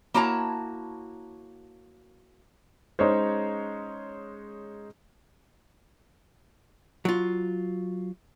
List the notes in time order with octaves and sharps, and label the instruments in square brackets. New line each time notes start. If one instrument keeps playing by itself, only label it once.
[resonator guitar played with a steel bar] A#3 E4 F#4 C#5 A5 A#5
[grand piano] G#3 C#4 C#5 [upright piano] D#4 C5
[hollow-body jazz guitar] F#3 F4